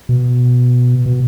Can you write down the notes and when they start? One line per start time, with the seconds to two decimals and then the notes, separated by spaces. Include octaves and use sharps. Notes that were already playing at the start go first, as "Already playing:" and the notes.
0.09 B2
1.06 B2